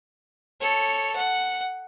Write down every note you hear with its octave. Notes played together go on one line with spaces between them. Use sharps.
A4 C#5
F#5